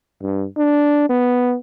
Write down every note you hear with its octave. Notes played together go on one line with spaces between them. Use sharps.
G2
D4
B3